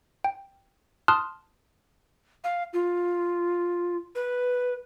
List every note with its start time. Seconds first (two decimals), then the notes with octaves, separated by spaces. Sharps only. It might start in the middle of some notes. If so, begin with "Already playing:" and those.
0.24 G5
1.08 A5 C6 D#6 F6 F#6
2.44 F5
2.73 F4
4.15 B4